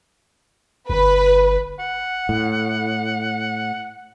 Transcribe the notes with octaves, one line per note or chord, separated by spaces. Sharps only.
G1 B4
F#5
A2